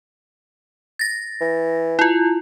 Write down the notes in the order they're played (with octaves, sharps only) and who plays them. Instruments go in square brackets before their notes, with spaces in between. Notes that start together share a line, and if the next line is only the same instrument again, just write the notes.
[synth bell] A6 A#6
[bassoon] E3
[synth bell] E4 F4